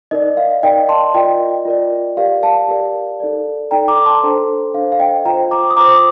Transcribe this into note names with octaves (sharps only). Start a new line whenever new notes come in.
D#4 A#4 D5 D#5
F5
D#4 A#4 D5 D#5 G5
A5 C6
F4 A#4 D5 D#5 G5
F4 A#4 D5
G4 A#4 D5 F5
F5 A5
G4 A#4 D5
D#4 A4 D5
D#4 A4 D5 G5 A#5
A#5 D6
A5 C6
D4 A4 C5
D4 A4 C5 F5
F5
D#5 G5
F4 C5 G5 A#5
A#5 D6
D#6
F4 C5 A#5 D6